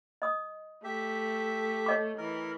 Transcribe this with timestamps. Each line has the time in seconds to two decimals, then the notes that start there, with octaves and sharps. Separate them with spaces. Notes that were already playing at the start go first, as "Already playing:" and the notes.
0.22 D#5 D#6
0.84 A3 G4 E5
1.86 C#5 D#5 D6
2.18 E3 A#4